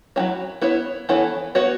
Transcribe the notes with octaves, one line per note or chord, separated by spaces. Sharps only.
F#3 C#4 E4 C#5
B3 E4 C#5
E3 B3 E4 A4 C#5
B3 F#4 C#5